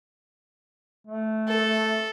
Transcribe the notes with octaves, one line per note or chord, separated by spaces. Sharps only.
A3
A4